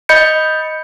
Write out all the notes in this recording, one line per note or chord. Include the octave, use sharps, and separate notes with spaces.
D#5 B5 G6 C#7